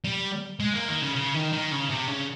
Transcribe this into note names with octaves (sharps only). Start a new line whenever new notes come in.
G3
G#3
A#3
D#3
C#3
C#3
D#3
D#3
C#3
C3
C#3